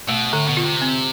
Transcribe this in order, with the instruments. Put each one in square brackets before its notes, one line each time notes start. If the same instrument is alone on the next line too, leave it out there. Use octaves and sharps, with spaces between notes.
[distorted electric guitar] B2 [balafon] A3
[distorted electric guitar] A2 [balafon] D3
[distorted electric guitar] B2
[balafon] F4
[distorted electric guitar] C3
[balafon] C4